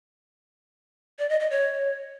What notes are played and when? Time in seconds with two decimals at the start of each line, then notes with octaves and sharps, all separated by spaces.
1.19 D5
1.29 D#5
1.40 D#5
1.51 C#5